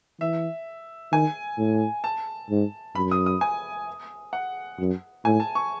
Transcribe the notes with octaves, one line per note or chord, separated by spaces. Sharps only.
E3 E5
D#3 G#5
A2
A5
G#2
F#2 B5
D#6
D#6
G#5
F#5
F#2
A2 G#5
A5
C#6